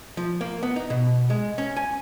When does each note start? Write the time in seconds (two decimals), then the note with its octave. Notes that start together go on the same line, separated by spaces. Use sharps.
0.17 F3
0.41 A#3
0.63 B3
0.76 D#4
0.90 B2
1.30 G#3
1.58 C#4
1.76 G#5